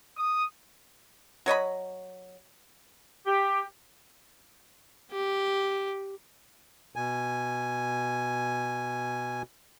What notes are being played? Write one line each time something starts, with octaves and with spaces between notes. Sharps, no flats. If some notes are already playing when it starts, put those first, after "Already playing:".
D#6
F#3 C#5 D#5 B5
G4
G4
B2 G#5